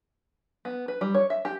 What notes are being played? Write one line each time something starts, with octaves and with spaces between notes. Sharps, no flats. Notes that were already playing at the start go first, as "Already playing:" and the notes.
B3
B4
G3
C#5
E5
G4